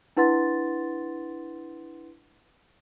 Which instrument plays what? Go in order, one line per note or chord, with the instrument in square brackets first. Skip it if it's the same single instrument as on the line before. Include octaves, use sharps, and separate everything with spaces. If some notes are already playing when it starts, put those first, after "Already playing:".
[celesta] D4 E4 B4 F#5 C6 A6